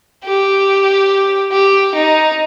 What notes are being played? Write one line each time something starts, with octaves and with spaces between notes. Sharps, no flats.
G4
G4
D#4